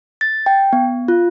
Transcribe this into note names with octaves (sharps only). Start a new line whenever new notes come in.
A6
G5
B3
F4